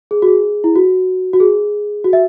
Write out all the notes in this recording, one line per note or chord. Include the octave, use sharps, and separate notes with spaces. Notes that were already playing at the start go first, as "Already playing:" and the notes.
G#4
F#4
G#4
E4
F#4
F#4
G#4
F#4
E5